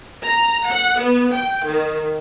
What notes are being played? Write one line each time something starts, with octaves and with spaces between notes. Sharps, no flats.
A#5
F#5
B3
G5
D#3